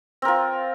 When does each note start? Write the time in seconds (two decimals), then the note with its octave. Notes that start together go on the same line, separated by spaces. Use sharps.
0.22 C4
0.25 A#4
0.28 F4